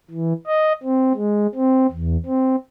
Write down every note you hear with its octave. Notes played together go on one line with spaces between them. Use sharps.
E3
D#5
C4
G#3
C4
E2
C4